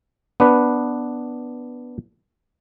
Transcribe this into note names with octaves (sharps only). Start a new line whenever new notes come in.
B3 D4 B4